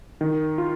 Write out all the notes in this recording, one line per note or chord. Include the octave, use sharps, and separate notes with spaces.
D#3
F4